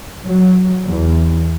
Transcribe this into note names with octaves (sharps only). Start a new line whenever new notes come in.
F#3
E2